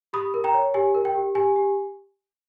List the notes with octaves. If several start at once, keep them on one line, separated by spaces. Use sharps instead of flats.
G4 B5 D#6
A#4
G5 A#5
C#5
G4 G#5
A#4
G5
G4
G4 G#5
G4